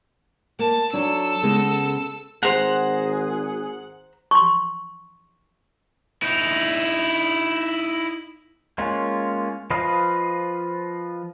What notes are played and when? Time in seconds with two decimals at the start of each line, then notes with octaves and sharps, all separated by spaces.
0.59 A#3 A5
0.93 F#3 D4 D#4 A4 E6
1.43 C#3 G#3 B3
2.43 G#1 G#4 C5 F#5 A#5
4.31 C6 C#6
6.22 D#4 E4
8.78 G#3 A#3 C#4 F4
9.70 F3 B4 D#5 F5